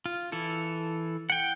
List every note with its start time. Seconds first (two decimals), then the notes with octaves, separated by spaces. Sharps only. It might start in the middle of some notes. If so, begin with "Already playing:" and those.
0.06 F4
0.32 E3 E4 A4
1.30 F#5 G5